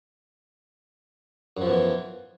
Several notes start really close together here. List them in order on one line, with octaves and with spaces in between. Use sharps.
F#2 F3 B2 E3